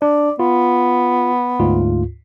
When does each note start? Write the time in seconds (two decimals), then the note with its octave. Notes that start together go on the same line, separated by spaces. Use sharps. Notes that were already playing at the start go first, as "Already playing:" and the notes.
0.02 D4 D5
0.40 B3 F4
1.60 D2 G#2 F4